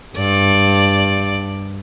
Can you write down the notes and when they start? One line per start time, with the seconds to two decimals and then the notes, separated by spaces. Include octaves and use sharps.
0.16 G2 D5